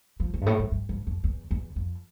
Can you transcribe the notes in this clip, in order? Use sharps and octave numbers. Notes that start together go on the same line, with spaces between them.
F3
E3
G2
A2
G2
G2
G2
F2
E2
E2
F2